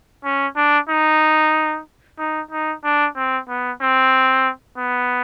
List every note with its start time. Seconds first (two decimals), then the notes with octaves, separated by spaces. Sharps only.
0.24 C#4
0.56 D4
0.89 D#4
2.19 D#4
2.51 D#4
2.84 D4
3.16 C4
3.49 B3
3.81 C4
4.78 B3